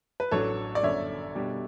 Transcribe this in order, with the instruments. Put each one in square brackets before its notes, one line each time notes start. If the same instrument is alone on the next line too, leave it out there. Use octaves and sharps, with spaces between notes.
[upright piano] B4
[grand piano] A1 A2 F#3 A3 D4 [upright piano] A4 C#5
[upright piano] D5
[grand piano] G1 F#2 D3 [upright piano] C#5 E5
[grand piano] B2 G3 D4 G4